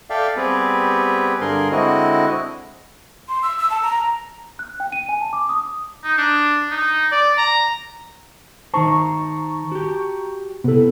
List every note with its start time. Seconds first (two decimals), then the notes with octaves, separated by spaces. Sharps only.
0.10 A4 D5 E5 F5 G5
0.37 G3 B3 C4 G4 G#4 B4
1.41 G2 D3 G#4 A#4 C6
1.72 D3 G#3 C4 E4 F#4 D#5
3.29 C6
3.43 E6
3.59 E6
3.71 A5
3.83 A#5
4.59 F#6
4.80 G5
4.92 D#7
5.09 G#5
5.21 A5
5.33 D6
5.49 D#6
6.03 D#4
6.18 D4
6.71 D#4
7.12 D5
7.38 A#5
8.74 D#3 D#4 C5 A5 A#5 C#6
9.72 F#4 G4
10.64 C3 B3 E4 A4